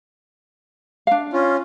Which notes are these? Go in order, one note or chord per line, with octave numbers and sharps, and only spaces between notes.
D4 F5
C#4 F4